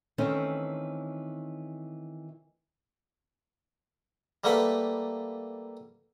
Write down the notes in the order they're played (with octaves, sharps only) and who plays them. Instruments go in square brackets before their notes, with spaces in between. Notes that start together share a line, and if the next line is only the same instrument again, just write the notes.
[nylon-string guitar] D#3 E3 A3 C4 C#4
[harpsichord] G3 A3 A#3 B4 F#5 B5